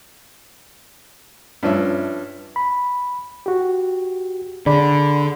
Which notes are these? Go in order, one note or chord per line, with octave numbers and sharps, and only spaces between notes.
G2 F3 C#4 E5
B5
F#4 G4
D3 G#4 D5 B5